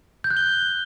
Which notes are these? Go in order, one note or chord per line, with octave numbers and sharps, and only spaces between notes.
G6
F#6
G7